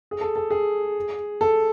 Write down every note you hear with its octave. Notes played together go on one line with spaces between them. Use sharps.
G#4
A4
A4
G#4
A4